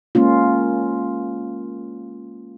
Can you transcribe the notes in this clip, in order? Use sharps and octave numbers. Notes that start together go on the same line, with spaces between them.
G#3 A#3 C#4 F4